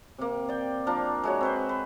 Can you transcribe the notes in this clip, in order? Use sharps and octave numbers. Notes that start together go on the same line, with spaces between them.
C3 A#3
D5 G5
F3 A#3 D4 A#4
G#3 F#4 C#5
C4 B4 C5
B4